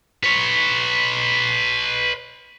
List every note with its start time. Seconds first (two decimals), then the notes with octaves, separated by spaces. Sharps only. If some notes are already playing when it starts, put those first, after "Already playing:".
0.23 B4 C#5